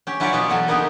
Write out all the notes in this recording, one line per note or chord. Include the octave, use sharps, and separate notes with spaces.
C#4 G4
F#3 E4 F4 G4 C#5 D5
B2 B3 F4 G4
B2 E3 F#3 A4 G#5
C#3 A#3 B3 D#4 G4 G#4